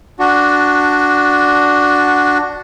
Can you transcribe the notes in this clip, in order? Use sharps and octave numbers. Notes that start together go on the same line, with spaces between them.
D4 F#4